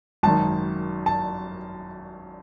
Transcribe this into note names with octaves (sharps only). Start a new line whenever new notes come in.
G#1 F#2 D#3 A5
A5